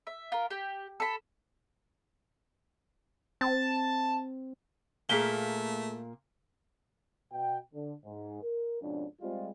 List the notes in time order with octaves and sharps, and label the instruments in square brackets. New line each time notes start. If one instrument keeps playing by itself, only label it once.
[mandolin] E5
F4 A#4
G4
A4 B5
[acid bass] C4 [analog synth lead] A5
[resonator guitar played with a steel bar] A#2 A#3 [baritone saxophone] A3 [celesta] G#4 B6 G7
[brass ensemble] B2 G5
D3
G#2
A#4
F2 G#2 B2 C#4 D4
G3 G#3 C4 F4